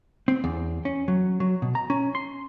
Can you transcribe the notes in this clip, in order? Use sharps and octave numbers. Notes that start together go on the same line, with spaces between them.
C4
E2
C#4
F#3
F#3
B2
A#5
C#4
C6